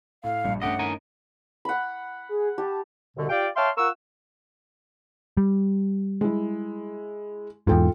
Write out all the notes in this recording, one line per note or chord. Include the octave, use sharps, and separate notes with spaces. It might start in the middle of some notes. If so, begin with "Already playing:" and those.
A2 F5
A#1 G2 G3
G2 A3 C#4 G4 D#5 F#5
D#4 A#4 G#5
F#5 B5
G#4
G4 A5
C2 B2 D3
F4 G4 D5 F5 G5
C#5 E5 F5 G5 A5 C6
F4 A#4 F#5 C#6 E6
G3
G#3 E4
E2 G#2 F4 A4 G5